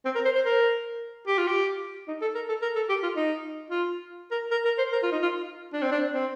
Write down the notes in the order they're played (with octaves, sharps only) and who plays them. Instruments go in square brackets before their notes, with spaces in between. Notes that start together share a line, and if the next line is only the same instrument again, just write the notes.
[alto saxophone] C4
A#4
C5
C5
A#4
G4
F4
G4
D#4
A4
A#4
A4
A#4
A4
G4
F4
D#4
F4
A#4
A#4
A#4
C5
A#4
F4
D#4
F4
D4
C4
D4
C4